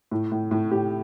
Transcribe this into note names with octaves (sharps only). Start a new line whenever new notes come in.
A2
A2
A2
A2 G4